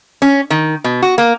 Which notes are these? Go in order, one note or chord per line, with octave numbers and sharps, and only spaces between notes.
C#4
D#3
B2
F#4
A#3